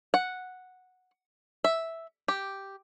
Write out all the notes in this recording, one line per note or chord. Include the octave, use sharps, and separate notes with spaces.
F#5
E5
G4